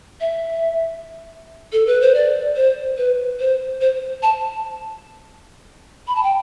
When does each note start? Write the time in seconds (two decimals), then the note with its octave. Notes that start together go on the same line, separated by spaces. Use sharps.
0.21 E5
1.73 A4
1.87 B4
2.01 C5
2.14 D5
2.56 C5
2.98 B4
3.40 C5
3.81 C5
4.23 A5
6.08 B5
6.16 A5
6.23 G5